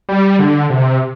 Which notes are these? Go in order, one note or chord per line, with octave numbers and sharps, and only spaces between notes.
G3
D3
C3